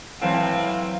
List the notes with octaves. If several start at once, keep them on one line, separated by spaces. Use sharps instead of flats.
A2 E3 F#3 C4 F5